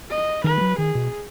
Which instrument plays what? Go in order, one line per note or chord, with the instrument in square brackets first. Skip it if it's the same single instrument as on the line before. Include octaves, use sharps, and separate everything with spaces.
[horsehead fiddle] D#5
[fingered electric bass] D#3 [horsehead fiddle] B4
[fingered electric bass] G#3
F#3
[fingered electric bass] D#3 [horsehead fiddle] G#4
[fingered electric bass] B2